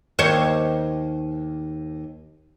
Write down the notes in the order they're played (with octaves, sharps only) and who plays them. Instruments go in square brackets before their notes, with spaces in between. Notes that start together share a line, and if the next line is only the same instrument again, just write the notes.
[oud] D#2 C5 C#5